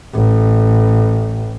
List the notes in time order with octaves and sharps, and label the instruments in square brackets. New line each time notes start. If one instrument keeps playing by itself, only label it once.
[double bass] A1